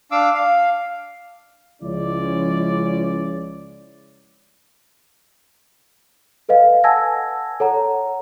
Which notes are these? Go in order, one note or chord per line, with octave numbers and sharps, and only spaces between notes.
D4 F5 D6 E6
F5
C#2 F3 G#3 C#4 E4 D5
A4 B4 D#5 F5
F#5 G#5 A5 E6 G#6 A#6
A4 C#5 F#5 A#5